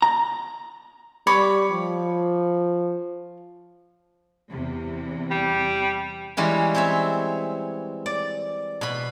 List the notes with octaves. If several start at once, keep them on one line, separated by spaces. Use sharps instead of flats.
A#5
G3 C#5 B5 D6
F3
E2 C3
G3
E3 G3 G#3 C#4
C4 C#5 E5
D5
B2 B5